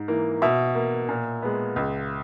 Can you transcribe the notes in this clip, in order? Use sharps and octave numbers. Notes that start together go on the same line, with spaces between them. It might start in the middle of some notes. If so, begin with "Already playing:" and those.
Already playing: G#2
E3 A#3
B2 E5
A#3
A#2
G#3 B3
C#2